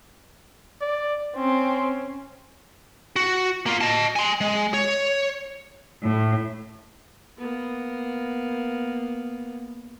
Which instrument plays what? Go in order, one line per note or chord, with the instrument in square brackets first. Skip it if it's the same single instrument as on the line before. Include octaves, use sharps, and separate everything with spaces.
[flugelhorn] D5
[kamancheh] C4 [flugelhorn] C#4
[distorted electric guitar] F#4
A#3 F4
D#5 A5
G#5 C6
G#3
C#5
[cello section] A2
[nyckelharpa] A#3 B3